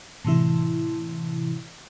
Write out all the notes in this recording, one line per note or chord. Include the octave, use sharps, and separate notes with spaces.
A2 C3 E3 E4